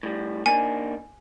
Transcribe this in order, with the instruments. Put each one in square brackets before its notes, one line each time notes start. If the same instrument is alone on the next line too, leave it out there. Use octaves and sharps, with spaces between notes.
[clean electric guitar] A2 G3
[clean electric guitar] A#3 D4 D#4 [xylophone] G#5